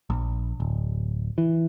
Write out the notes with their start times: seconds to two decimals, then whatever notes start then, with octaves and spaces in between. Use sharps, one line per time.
0.10 A#1
0.60 D1
1.38 E3